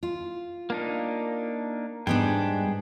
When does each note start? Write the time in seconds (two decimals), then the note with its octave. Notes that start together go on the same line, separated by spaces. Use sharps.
0.03 F4
0.70 A#3 D4 D#4
2.07 G#2 G3 B3 D4 G#4 G5